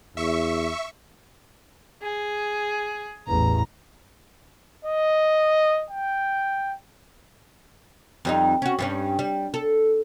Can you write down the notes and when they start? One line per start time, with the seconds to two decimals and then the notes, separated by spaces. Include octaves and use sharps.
0.17 E2 E5 C#6
2.02 G#4
3.27 A1 E2 A#5
4.85 D#5
5.90 G5
8.25 F2 G3 D#4
8.62 C#4 F#4
8.79 G2 G3 C#4
9.19 G3
9.54 A4